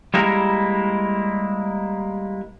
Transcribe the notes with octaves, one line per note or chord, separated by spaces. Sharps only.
G3 G#3 A#3 E4 A#4